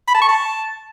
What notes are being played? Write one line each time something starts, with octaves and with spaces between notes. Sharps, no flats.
B5
A5
C#6
A5